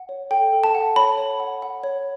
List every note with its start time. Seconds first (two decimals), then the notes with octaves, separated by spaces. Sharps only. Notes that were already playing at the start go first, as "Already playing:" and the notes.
Already playing: F#5
0.09 C#5
0.31 A4 G5
0.53 A4
0.64 A5
0.75 F#5
0.96 C#5 B5
1.18 C#5
1.40 F#5
1.62 F#5
1.84 C#5